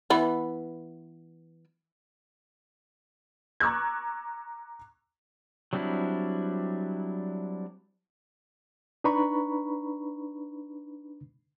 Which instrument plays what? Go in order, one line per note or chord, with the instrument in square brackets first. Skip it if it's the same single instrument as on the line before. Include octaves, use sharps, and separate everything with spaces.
[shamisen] E3 B3
[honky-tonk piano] A#5 C#6 D6 E6 F#6 G#6
[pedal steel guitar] F#3 G3 C4 D4 E4
[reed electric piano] D4 D#4 B4 A#5 B5 C#6